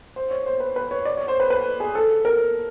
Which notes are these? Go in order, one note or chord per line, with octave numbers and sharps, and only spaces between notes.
C5
C#5
C5
B4
B4
C#5
D5
C#5
C5
B4
B4
G#4
A4
A#4